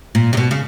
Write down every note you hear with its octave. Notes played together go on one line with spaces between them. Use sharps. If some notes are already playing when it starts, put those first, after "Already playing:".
A#2
C3
B2
C#3